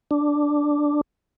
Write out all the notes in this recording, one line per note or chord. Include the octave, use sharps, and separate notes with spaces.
D4